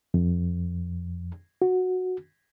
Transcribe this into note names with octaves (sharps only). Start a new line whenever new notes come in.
F2
F#4